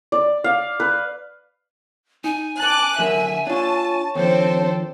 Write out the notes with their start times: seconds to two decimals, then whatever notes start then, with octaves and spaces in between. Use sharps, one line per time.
0.12 D5
0.44 F5
0.80 B4
2.24 D#4 G#5
2.60 A5 D6 F#6
2.98 D3 F#3 A#4 E5
3.47 D4 F4 C#5 A5 C#6
4.15 D#2 F3 C4 D4 A4 C5 C#5